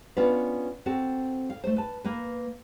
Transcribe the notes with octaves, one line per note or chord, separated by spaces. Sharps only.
B3 C#4 D4 F4 B4
C4 F#4 A4
F5
A3 C5
B4 A5
A#3 B4